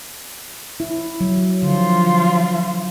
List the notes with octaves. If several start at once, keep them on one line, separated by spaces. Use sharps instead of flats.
E4
F#3
D3 F3 F4